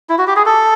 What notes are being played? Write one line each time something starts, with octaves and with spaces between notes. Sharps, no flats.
E4
F#4
G4
G#4
A4